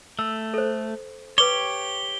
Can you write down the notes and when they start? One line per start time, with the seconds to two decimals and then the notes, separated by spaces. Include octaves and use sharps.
0.19 A3 E6
0.54 A4 C5
1.38 G4 B4 C#5 D6 G7